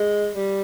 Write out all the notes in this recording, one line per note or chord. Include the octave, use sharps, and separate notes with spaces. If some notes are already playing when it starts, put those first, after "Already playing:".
Already playing: G#3
G3